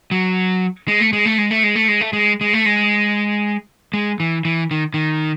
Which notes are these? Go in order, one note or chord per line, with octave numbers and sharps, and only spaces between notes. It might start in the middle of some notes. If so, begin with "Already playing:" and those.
F#3
G#3
A3
G#3
A3
G#3
A3
G#3
A3
G#3
A3
G#3
G#3
A3
G#3
G#3
E3
E3
D#3
D#3